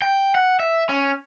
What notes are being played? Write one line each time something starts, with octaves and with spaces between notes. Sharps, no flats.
G5
F#5
E5
C#4